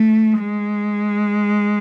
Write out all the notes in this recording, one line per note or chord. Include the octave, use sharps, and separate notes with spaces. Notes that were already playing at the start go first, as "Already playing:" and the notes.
Already playing: A3
G#3